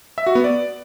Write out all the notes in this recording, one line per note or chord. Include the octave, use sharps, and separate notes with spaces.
E5
F#4
B3
D5